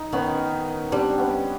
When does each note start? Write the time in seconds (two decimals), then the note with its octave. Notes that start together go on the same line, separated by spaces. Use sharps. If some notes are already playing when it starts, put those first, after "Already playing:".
Already playing: D#4
0.13 D#3 B3 C#4
0.92 G3 C4 D4
1.18 B3 C#4